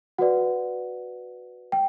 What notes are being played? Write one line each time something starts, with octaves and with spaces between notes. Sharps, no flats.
F#4 B4 D5 F#5
G5